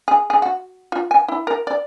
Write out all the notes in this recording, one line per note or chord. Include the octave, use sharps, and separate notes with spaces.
G#4
G#4
F#4
F4
G#5
E4
A#4
D5